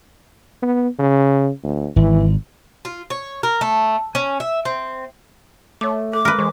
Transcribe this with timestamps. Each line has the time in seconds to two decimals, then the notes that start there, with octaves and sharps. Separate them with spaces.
0.62 B3
0.99 C#3
1.64 D2
1.96 G#1 E3
2.85 F4
3.10 C#5
3.43 A#4
3.61 A3
4.15 C#4
4.40 E5
4.65 C4
5.81 A3 C#5 D6
6.13 A4 D6
6.25 G#3 A#4 B4
6.39 E3 G#3